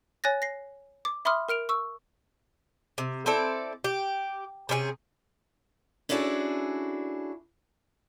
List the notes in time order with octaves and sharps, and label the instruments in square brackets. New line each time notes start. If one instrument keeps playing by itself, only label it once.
[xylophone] C#5 G#5 F#6 A6 A#6
A#6 C7
D6
E5 B5 C6 D6 D#6 F6
A#4 F6 D7 F7
C#6 E6
[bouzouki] C3
C4 E4 A4 D5
G4
C3 C#4 E4 G#4
[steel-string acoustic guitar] C#4 D4 E4 F#4 G#4 A4